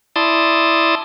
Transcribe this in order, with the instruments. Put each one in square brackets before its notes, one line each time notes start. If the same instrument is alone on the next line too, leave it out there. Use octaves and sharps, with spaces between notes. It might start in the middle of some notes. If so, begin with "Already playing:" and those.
[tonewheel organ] E4 D5 A5 C6 D#6